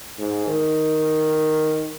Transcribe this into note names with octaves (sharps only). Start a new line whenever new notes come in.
G#2
D#3